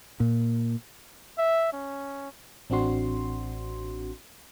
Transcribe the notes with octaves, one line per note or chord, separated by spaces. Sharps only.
A#2
E5
C#4
A1 C4 D4 F#4 C6